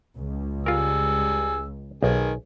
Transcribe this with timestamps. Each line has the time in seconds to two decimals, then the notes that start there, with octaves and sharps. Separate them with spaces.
0.16 C#2
0.66 G3 F4 G#4 A#4 E6
2.03 B1 D#3 G#4